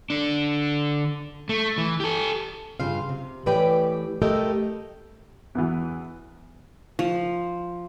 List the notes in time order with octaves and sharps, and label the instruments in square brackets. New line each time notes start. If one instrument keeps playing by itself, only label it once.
[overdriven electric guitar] D3 D4
A3
E3
G4 A4
[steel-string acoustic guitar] G2 C#3 F4 F5
C3
A2 E3 G4 B4 D5 G5
A3 E4 G4 A4 A#4 D#5
[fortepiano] E2 E3
[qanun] F3